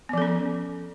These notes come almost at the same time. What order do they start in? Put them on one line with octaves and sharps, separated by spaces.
B3 F3 A4 C#4